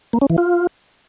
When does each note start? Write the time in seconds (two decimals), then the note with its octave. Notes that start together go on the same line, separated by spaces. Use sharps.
0.13 A#3
0.21 C#4
0.30 E3
0.38 F4